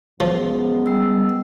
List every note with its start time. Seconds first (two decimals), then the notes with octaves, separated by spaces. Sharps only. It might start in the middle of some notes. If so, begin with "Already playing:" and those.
0.20 F#2 F3 G#3 B3
0.86 G3 E6